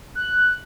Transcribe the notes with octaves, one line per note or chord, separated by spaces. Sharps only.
F#6